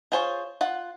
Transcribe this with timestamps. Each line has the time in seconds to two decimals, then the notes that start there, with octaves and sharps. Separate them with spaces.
0.12 F4 G#4 C5 C#5
0.61 F4 F#5